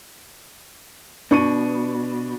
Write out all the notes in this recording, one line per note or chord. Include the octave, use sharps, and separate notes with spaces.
B2 D4 C#6 D#7